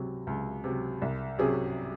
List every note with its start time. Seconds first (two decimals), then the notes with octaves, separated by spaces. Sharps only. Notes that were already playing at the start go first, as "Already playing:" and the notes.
Already playing: C#2 C3 F#3
0.27 C#2
0.64 C3 F#3
1.02 C2
1.38 C3 F#3 C#4 G#4